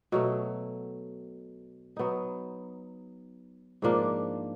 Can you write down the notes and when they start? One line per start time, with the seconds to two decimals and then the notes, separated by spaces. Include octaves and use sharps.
0.12 B2 F#3 A3
1.97 F#3 B3 D#4
3.82 G#2 F3 A#3 D4